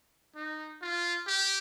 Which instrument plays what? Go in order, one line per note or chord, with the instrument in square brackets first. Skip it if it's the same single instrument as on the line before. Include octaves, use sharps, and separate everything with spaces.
[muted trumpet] D#4
F4
G4